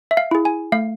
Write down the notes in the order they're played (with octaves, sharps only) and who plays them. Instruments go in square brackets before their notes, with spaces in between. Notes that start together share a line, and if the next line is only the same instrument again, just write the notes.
[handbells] E5
F5
E4 G#4
G#5
A3 F5